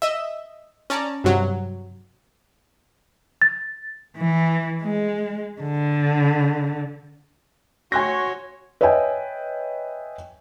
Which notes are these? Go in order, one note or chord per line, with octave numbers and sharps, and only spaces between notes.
D#5 E5
C#4 D5 A5 A#5
G2 C3 F#3
A6
E3
G#3
D3
F#4 C#5 F#5 G#5 C6 C#6 F#6 A#6
B4 C#5 D#5 E5 G5 G#5